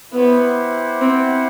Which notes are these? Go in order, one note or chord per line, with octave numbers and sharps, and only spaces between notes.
B3 E4 G4 C5 F#5
C4